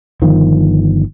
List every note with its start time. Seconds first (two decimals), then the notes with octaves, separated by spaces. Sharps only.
0.22 G1 D#3 F3